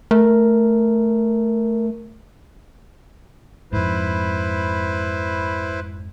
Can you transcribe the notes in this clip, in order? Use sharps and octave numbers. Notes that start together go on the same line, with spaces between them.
A3 A#4
F2 G#2 E4 B4 C5